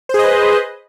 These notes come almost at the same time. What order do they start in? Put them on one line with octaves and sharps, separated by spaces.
C5 G#4 D#5 B4